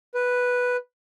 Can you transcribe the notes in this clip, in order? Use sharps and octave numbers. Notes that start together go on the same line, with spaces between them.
B4